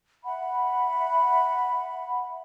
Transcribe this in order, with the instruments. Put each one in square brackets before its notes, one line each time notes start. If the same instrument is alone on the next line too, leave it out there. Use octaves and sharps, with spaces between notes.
[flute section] E5 F#5 B5